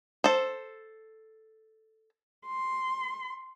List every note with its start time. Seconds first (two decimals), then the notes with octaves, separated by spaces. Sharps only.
0.24 A4 C5
2.47 C6